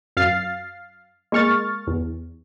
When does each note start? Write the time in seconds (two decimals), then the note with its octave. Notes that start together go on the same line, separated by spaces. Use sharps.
0.17 F#2 F5 F6 A6 C7
1.32 G#3 A#3 C#6 F6 A6
1.87 E2